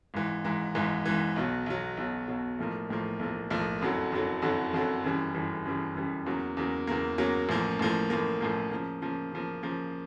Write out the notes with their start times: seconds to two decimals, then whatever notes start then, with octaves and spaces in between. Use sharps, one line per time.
0.14 G#1 G#2 E3
0.44 G#1 G#2 E3
0.75 G#1 G#2 E3
1.06 G#1 G#2 E3
1.36 B1 B2 F#3
1.66 B1 B2 F#3
1.97 B1 B2 F#3
2.28 B1 B2 F#3
2.59 B1 A2 F3 A#3
2.89 B1 A2 F3 A#3
3.19 B1 A2 F3 A#3
3.51 B1 A2 F3 A#3
3.81 F#1 F2 D3 F#3
4.12 F#1 F2 D3 F#3
4.42 F#1 F2 D3 F#3
4.73 F#1 F2 D3 F#3
5.04 G1 F#2 C#3 E3 G3
5.34 G1 F#2 C#3 E3 G3
5.65 G1 F#2 C#3 E3 G3
5.95 G1 F#2 C#3 E3 G3
6.26 E2 C#3 F#3 A#3
6.57 E2 C#3 F#3 A#3
6.87 E2 C#3 F#3 A#3
7.18 E2 C#3 F#3 A#3
7.49 A1 A2 F3 A#3
7.79 A1 A2 F3 A#3
8.10 A1 A2 F3 A#3
8.41 A1 A2 F3 A#3
8.71 C#3 F3 A#3
9.02 C#3 F3 A#3
9.32 C#3 F3 A#3
9.63 C#3 F3 A#3